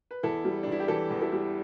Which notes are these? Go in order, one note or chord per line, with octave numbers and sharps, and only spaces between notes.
B4
E2 E4 A4
G3
D4
E2 E4
G4
E3 E4 A4
E2
E4 A4
G3